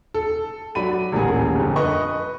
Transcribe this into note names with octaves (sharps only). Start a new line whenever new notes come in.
A4
F#3 D5 B5 D#7
D#1 A1 G3 A#3 G#4
G1 F2
B4 D#5 C#6